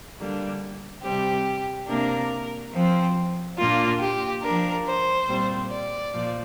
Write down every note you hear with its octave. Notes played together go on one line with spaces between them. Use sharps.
D3 G3 A#3 D4
C3 G3 C4 G4
C3 A#3 D4 A#4
F3 C4
A#2 A#3 D4 F4
G4
F3 D4 A#4
C5
A#2 G3 C4
D5
A#2 F3